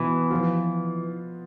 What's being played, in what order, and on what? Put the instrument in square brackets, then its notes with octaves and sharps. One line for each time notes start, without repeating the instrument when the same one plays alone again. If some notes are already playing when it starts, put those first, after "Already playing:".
Already playing: [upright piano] B2 B3 E4 [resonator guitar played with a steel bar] E3
[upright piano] F3 B3 F4